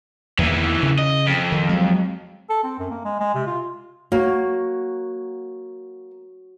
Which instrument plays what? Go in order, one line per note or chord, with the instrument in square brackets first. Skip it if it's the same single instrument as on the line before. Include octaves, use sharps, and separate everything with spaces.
[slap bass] E2 A#3 [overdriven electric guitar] D#3 E3
[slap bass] C#3
[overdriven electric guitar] D#5
F2
[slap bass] D#3
F#3 G#3
[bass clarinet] A4
C4
F#2
A#3
G#3
G#3
C3
F4
[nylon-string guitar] A#3 [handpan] F#4 C#5